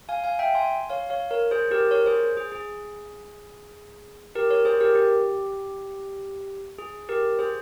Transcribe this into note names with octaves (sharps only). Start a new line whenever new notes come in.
F5 G#5
F5 G#5
E5 G5
G#5 C6
C#5 F5
C#5 F5
A#4 C#5
G#4 C5
G4 A#4
A#4 C#5
G#4 C5
G#4
G#4
G4 A#4
A#4 C#5
G#4 C5
G4 A#4
G4
G#4
G4 A#4
G#4 C5